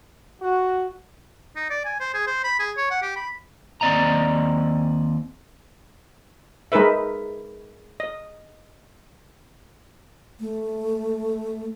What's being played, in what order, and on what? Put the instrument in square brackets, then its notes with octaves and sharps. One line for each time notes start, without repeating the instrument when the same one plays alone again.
[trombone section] F#4
[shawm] D#4
D5
G#5
C5
G#4
C5
B5
G#4
C#5
F#5
G4
B5
[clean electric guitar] D#2 C4 D5 D#5 A#5
[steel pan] G#3 D#4 A#4 B4 E5
D#5
[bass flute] A3